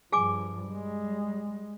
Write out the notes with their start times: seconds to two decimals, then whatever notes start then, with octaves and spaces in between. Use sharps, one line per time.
0.12 G2 F3 G#4 G#5 D6
0.68 G3 G#3